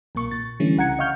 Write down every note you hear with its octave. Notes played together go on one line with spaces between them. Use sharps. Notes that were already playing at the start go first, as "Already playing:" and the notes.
B1 A#2 A#3 C#6
A#2 A6
D3 E3 G3 A3 C#4
C2 C#3 F#5 A#5 G#6 C#7
D#5 F5 F#5 C#6 F6 G6